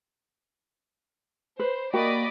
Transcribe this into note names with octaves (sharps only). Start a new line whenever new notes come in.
B4 C5
A#3 F#4 D5 D#5 G5 B5